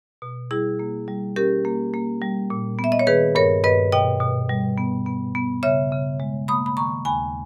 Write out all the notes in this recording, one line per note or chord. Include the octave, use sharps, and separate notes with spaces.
B2
G3 E4 G#4
A#3
G3
C#4 G4 A#4
A#3
A#3
G3
A#2
B3
E5
D#5
C#5
D#3 G#4 B4
G2 A#4 C#5
G2 B4 D#5
B2 D#5 G5
B2
G3
B3
B3
B3
C#3 C#5 E5
C#3
G#3
A#3 B5 D#6
B5
D#3 A#5 C#6
D#2 G#5 B5